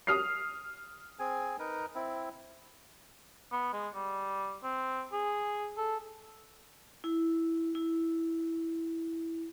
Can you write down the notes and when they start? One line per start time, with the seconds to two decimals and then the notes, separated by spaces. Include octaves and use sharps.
0.07 D#6 F6 C7
1.19 C4 G#4 G#5
1.59 D#4 A#4 B4
1.95 C4 E4
3.52 B3
3.73 G#3
3.94 G3
4.63 C4
5.13 G#4
5.77 A4
7.04 E4
7.75 E4